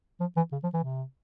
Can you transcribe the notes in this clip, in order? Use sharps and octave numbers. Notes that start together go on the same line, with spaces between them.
F3
E3
C#3
F3
E3
C3